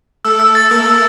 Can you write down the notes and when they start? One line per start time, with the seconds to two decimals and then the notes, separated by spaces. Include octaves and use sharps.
0.24 A3 A4 E6
0.40 E6
0.55 A6
0.71 A#3 A#4 E6
0.86 E6